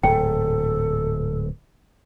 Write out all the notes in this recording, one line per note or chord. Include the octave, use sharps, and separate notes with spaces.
D1 G#2 A4 G5